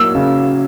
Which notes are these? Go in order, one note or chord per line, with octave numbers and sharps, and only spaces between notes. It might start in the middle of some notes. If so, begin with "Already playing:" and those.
Already playing: F#3 A#3 E6
C#3